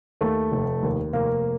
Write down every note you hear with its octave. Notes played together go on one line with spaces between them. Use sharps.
D#2 A3
F1
D#2
F1 A#3